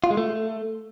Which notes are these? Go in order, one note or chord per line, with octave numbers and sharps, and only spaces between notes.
F4
G#3
A3